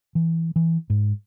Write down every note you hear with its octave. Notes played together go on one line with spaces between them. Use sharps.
E3
E3
G#2